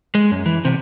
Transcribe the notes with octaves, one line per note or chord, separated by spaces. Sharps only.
G#3
F#2
E3
B1 C3